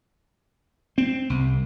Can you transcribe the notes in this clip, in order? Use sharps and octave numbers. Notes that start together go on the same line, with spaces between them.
C4
C2